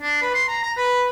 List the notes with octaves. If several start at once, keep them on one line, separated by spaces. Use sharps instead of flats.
D4
B4
C6
A#5
A#5
B4